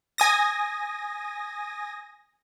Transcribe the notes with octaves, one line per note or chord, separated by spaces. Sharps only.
G#5 D#6 A#6